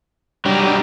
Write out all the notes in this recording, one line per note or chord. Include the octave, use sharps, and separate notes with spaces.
F#3 G3 D4 D#4